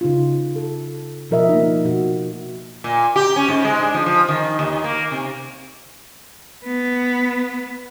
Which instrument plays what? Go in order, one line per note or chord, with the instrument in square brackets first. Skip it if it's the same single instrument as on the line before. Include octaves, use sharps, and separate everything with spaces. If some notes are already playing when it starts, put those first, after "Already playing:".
[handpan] C#3 D#4 F4
A4
B2 F3 A#4 D#5 E5
A#3 D#4
B2 F#4
[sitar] A#2
G4
C#4
G#2
G#3
D4
F3
F3
D#3
D#2
A#3
C3
[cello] B3